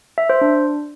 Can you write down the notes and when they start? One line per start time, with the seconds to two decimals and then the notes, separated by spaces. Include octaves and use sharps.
0.18 E5
0.30 C5
0.41 D4